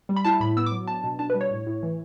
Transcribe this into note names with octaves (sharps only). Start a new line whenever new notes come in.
G3
B5
E4 A5
A2 B5
B3 E6
D6
F#3
D4 A5
B2
D4 A5
B4
G3
C#5
A2
A2
E3